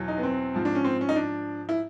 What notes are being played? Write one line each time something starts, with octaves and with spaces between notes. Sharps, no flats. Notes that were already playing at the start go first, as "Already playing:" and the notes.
Already playing: E2 B2 F#3
D#4
B3
C4
G#2 F3
D4
C#4
C4
C#4
D#4
D4
E4